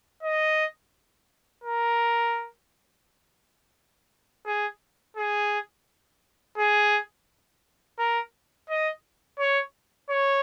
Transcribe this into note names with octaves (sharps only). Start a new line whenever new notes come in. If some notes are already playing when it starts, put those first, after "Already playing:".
D#5
A#4
G#4
G#4
G#4
A#4
D#5
C#5
C#5